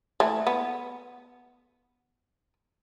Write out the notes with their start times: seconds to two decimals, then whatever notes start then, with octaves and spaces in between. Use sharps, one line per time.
0.20 E3 A3
0.47 B3